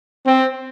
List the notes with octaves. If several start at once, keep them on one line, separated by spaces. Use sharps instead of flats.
C4